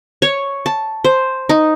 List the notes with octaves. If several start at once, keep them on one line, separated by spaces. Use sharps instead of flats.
C#5
A5
C5
D#4